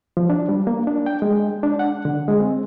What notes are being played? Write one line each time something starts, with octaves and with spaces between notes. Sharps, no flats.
F3
D4
G3
A#3
D4
G5
G#3
D4
F#5
D3
G#3
C4